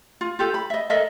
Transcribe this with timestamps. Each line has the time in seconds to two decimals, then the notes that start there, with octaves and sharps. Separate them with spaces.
0.21 F4
0.39 F4 G4 A4
0.54 B5
0.70 D#5 E5
0.90 A4 A#4 D#5 E5